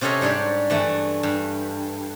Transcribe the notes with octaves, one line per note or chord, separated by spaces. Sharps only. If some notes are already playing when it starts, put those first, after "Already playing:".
C3 C#4 G4 A4 C#5 D#5
G#2 G3 D4 C#5
G2 E3 A3
G2